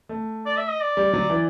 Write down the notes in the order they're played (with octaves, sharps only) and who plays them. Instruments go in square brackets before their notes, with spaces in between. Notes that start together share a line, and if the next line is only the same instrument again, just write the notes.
[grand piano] A3
[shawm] D5
E5
D#5
D5
[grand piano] G3
F#3
E3